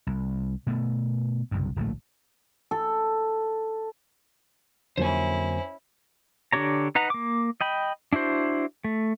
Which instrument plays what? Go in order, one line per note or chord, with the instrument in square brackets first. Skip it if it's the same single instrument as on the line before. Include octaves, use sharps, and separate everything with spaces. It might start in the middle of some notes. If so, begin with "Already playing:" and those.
[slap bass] C2
B2 A3 B3
F#1 C2 G2
D1 A#1 A3
[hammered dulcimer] A4
[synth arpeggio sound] F2 [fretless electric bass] D3 F#3 A#3 [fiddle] C#4 E4 [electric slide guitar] C5 G#5
[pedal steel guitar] D3 D4 G4 C#5 A#5
D#4 B4 F#5 A#5
A#3 D6
D#5 G5 B5
D4 E4 F#4 C5
A3